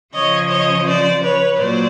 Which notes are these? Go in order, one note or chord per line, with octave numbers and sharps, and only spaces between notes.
C#3 F3 C#5 D#5
C#5 D#5
C5 D5
B4 C#5
A#2 F#3 C5 D5